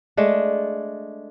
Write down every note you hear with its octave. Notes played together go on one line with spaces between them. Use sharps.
G#3 A3 D4